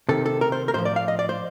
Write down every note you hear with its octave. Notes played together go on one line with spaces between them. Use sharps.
C3 D#3 A4
A4
A#4
C5
A#4
A2 F3 C5
D5
F5
D#5
D5
C5